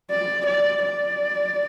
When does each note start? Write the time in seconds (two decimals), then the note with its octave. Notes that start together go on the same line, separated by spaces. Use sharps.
0.10 D5
0.46 D5
0.84 D5